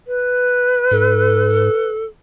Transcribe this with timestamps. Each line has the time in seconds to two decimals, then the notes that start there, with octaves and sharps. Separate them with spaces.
0.07 B4
0.91 G#2 A4